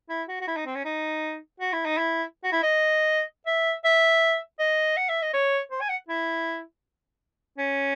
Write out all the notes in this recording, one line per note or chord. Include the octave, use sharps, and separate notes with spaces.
E4
F#4
F#4
E4
D#4
C4
C#4
D#4
F#4
E4
D#4
E4
F#4
E4
D#5
E5
E5
D#5
F#5
E5
D#5
C#5
C5
G#5
F#5
E4
C#4